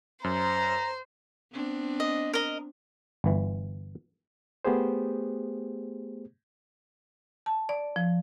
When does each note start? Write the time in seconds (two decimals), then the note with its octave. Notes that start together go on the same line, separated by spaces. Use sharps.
0.24 F#2 C5 A#5
1.52 B3 C4 D4
2.00 D#5
2.33 A#4 D#5
3.24 G1 E3
4.65 A3 B3 G4 G#4 C5
7.46 A5
7.69 D5
7.96 F3